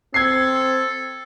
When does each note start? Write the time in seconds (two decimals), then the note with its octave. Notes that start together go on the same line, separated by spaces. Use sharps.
0.14 C4 A4 G#6 C7